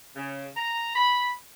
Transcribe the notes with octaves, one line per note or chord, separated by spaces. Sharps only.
C#3
A#5
B5